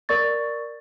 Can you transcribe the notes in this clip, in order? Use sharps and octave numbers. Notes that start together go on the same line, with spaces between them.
A#4 D5 C#6 A6